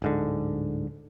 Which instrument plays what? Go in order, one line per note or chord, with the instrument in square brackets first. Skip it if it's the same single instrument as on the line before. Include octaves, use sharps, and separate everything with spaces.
[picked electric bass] D1 G#2 D3